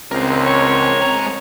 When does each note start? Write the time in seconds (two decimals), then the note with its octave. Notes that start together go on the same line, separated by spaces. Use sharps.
0.11 C#2 C4 A#4 C5
0.44 C#5
1.02 G#3 A#5